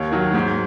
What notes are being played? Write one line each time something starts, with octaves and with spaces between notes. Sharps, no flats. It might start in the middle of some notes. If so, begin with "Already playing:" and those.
Already playing: D#2 C#5
D#3 F#3
G#2